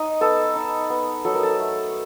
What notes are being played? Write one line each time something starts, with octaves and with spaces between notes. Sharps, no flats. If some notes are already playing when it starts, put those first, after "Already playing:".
Already playing: D#4 D#5
B3 A4
D#4
B3
F#3 A4
A#4
A4
A3